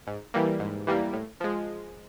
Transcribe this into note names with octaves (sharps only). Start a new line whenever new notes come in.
G#2
E3 G3 A#3
G#2
E3 G3 A#3
A2
F3 G#3